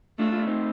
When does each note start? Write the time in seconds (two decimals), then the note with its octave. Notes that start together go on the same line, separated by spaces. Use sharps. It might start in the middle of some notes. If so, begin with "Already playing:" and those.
0.19 A3 D4 F4
0.32 D4 F4
0.47 C4 D#4